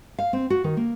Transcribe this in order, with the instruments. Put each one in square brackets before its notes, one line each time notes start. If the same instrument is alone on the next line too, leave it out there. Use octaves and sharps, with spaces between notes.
[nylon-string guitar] F5
C4
F#4
D#3
A#3